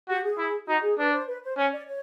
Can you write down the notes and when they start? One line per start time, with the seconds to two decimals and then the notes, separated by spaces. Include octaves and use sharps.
0.09 F#4 G4
0.24 G#4
0.38 E4
0.68 D#4 F#4
0.83 G#4
0.98 D4 B4
1.13 C5
1.28 B4
1.43 C5
1.57 C#4 C#5
1.72 D5
1.87 C#5